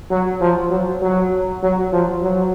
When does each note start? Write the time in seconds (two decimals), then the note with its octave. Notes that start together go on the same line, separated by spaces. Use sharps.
0.11 F#3
0.41 F3
0.71 F#3
1.02 F#3
1.63 F#3
1.93 F3
2.24 F#3